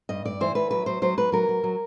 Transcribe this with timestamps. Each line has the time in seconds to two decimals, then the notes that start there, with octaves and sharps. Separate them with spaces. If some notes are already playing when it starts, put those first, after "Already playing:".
0.09 G2 D#5
0.25 G2 D5
0.41 E3 C5
0.55 E3 B4
0.71 F#3 B4
0.86 F#3 C5
1.02 F#3 C5
1.17 F#3 B4
1.32 F#3 A#4
1.49 F#3
1.63 F#3